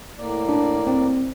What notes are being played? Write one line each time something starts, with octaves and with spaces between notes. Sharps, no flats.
A2 A#3 D5
D4
C4